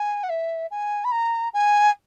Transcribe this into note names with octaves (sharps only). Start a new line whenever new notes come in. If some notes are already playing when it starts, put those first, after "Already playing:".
Already playing: G#5
F#5
E5
G#5
B5
A#5
G#5